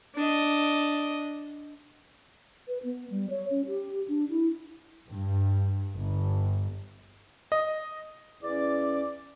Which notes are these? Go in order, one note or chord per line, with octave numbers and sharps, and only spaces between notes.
D4 D#5
B4
B3
G3
C#5
C#4
G4
D4
E4
G2
G1
D#5
E2 C#4 D5 D6